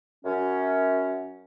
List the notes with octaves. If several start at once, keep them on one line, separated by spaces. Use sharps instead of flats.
F#2 C#4